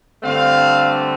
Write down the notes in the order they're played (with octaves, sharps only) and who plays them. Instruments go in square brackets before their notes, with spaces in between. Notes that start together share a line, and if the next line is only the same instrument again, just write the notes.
[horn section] G2 D3 A3 C4 F5